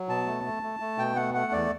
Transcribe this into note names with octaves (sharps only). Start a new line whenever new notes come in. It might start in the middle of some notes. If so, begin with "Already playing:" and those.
Already playing: F#3
B2 A5
A3
A3
A3
A3
B2 G5
A3 F#5
A3 F#5
E2 D5